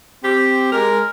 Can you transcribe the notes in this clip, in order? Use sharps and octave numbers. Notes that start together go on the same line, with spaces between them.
C4 G4
G#3 A#4